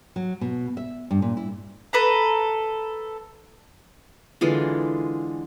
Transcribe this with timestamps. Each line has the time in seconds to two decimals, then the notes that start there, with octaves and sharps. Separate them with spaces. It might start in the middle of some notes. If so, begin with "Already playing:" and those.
0.16 F#3
0.41 B2
0.77 E5
1.11 G2
1.22 A#2
1.37 E4
1.93 A4 B4 A#5
4.41 D3 E3 G#3 F4